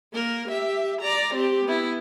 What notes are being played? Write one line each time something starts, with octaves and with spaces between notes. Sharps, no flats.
A#3 A#4
G4 E5
D5 A#5
C4 G4
B3 E4